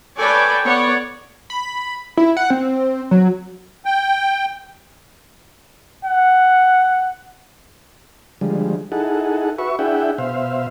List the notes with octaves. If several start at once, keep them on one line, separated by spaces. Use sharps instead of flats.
A4 B4 C#5 D5 G5 G#5
B3 C#5 D5 F#5
B5
E4
F#5
C4
F#3
G5
F#5
D3 F3 G3 G#3
D#4 E4 G#4 A4 F#5
F#4 B4 E5 C#6
D4 E4 G#4 E5 F#5 G5
B2 C5 E5 F5